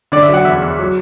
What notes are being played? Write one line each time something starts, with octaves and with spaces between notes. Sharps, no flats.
D3 D5
E5
F#3
F#5
E2 E5
E2
F#3